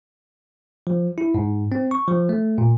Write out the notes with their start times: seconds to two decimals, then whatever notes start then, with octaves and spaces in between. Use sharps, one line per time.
0.87 F3
1.18 E4
1.34 G#2
1.72 C4
1.91 C#6
2.08 F3
2.29 A3
2.58 A#2